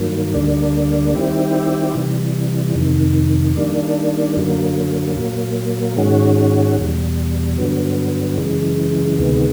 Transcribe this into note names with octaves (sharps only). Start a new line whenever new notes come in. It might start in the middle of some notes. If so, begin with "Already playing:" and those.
Already playing: G2 D#3 F#3 A#3
D2 D3 G3 A#3 D4
D#3 G3 C4 E4 G4
C3 E3 G3
F2 C3 D#3
D#3 G3 A#3 D4
F#2 D3 F#3 A#3
A#2 F#3 A#3
G#2 D#3 G#3 C#4 F#4
E2 B2 G3
G2 D3 F#3 B3
F#2 C#3 E3 G#3
D2 C3 D#3 G#3 B3